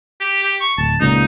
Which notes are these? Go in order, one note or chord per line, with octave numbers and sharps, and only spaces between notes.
G4
G4
C#6
D1 A5
C#2 A#2 D#4